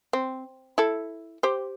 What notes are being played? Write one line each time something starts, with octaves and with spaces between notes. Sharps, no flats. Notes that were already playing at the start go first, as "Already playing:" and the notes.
C4
E4 A4
G4 C5